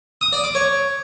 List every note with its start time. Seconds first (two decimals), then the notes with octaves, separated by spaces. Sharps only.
0.21 D#6
0.33 D5
0.44 D6
0.55 C#5